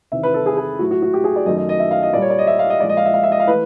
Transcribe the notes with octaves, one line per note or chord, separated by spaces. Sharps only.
E2 C3 D#3 E5
B4
A4
G#4
G#4
A2 F#3 A3 F#4
F#4
F#4
G4
G#4
D5
F#2 D#3 F#3 A3 D#5
D#5
D#5
E5
F5
D#5
A#2 G3 D5
C#5
D5
D#5
E5
F5
D#5
A#2 F3 G#3 D5
D#5
F5
E5
F5
E5
D#5
F5
E3 A3 B4